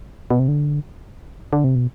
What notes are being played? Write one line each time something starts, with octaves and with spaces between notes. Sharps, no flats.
B2
C3
D3
D3
C3
B2